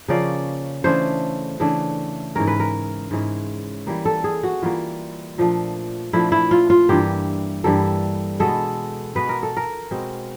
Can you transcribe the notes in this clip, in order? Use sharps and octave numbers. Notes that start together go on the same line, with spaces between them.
C#3 F3 A#3 C#4 D5
C#3 E3 A3 D4 C5
C#3 E3 A3 D4
G#2 E3 G#3 C#4 A#4
B4
A#4
G#2 E3 G#3 C#4
E3 G3 A#3
A4
G#4
F#4
E3 G3 A#3 F4
A#2 F3 A3 D4
A#2 F3 A3 D4 E4
E4
F4
F4
G2 E3 G3 A#3 G4
G2 E3 G3 A#3 A4
B2 G#3 B3 A4
B2 G#3 B3 B4
A#4
A4
A#4
B2 G#3 C4